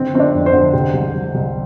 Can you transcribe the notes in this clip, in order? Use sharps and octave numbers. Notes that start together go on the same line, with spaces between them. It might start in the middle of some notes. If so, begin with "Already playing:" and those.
Already playing: D3 C4
F3 C4
D4
F2
C5
D3
C3
C2
C2
C2